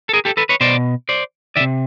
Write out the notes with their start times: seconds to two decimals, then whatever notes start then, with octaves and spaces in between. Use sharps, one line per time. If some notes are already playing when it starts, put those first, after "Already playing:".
0.09 A4
0.13 G#4 A#4
0.25 G4 A4
0.37 A4 B4
0.49 B4 C#5
0.61 B2 C5 D5
1.09 C5 D5
1.56 D#3 D5 E5
1.60 C3